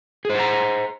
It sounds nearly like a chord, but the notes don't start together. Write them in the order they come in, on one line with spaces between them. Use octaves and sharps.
G#4 C5 F#5 A#5